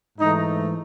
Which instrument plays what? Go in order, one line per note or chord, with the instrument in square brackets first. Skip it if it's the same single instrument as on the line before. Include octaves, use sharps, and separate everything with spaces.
[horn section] G#2 E3 A3 D#4